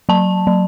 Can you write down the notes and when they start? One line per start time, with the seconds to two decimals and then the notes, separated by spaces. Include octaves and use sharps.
0.09 F#3 A5
0.47 F#3